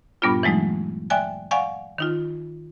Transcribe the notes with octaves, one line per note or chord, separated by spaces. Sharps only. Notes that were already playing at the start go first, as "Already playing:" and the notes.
G2 A#2 G3 B3 D4 F4
E3 F#3 G#3 A3 D#4
D5 E5 G5 G#5 F#6
D5 F5 F#5 G#5 C#6
D#3 D#4 F4